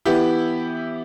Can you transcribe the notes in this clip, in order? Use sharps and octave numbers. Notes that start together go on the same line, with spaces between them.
E3 B3 E4 G4